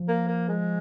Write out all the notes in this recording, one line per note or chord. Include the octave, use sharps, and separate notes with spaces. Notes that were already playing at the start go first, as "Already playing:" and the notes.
Already playing: F3
A#3
A#3
G#3